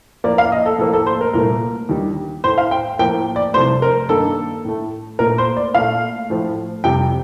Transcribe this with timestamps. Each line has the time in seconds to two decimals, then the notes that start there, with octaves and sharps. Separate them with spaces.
0.24 A2 F3 A#3 D5
0.38 F5
0.52 D#5
0.66 A4
0.78 A2 F3 A#3 A4
0.93 A4
1.06 C5
1.21 A#4
1.33 C2 A#2 A3 A#4
1.89 D#2 D3 G3
2.44 A2 A3 C5
2.58 F5
2.71 G5
2.99 A2 F3 A#3 G5
3.36 D5
3.54 C2 C3 F3 A3 C5
3.82 A#4
4.09 G2 D#3 A#3 A4
4.65 A2 A3
5.19 A#2 A3 A#4
5.38 C5
5.57 D5
5.74 A#2 A3 F5
6.30 A2 F3 A3
6.84 F2 C3 G3 G5